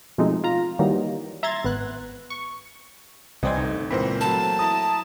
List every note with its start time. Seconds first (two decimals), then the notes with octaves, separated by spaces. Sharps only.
0.18 B2 F3 G#3 A3 C4 D#4
0.44 F4 A#5
0.79 D#3 E3 F#3 G3 A#3 D#4
1.43 E5 A#5 C6 G#6 A6
1.64 G#1 B3 F#6
2.30 C#6
3.43 C2 E3 C4 C5 D5 D#5 G#5 G#6
3.56 G1 A3 D#4
3.91 C#2 A#2 E3 C4 A#4 C5 B5
4.21 F#3 A3 A#3 A5
4.59 E4 A#5 D#6